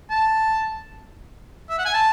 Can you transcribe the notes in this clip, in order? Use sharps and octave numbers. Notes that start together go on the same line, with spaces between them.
A5
E5
F#5
G#5
A5